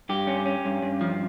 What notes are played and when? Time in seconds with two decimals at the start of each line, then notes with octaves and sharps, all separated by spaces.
0.09 G2 G4
0.27 C#4
0.46 C#4
0.65 G2
0.83 G2
1.01 F3